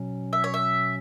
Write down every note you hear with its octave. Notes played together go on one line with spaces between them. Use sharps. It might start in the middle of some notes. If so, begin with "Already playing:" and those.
Already playing: B2 F#3 C#4
E5
C#5
E5